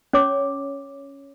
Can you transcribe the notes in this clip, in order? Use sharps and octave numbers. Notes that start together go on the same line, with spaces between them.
C#4 C#5 D6